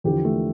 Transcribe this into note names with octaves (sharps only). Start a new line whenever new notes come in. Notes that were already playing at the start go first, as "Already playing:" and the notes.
E2 D3 F3 G4
A3